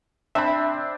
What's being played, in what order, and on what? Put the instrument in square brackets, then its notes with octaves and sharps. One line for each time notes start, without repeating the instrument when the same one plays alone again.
[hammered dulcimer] C4 D4 [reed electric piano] E5 B5